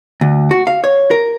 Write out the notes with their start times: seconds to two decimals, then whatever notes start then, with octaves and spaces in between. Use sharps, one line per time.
0.21 D2
0.51 F#4
0.67 F5
0.84 C#5
1.11 A#4